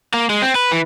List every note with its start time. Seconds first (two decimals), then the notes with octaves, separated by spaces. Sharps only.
0.14 A#3
0.30 G#3
0.42 C4
0.55 B4
0.71 E3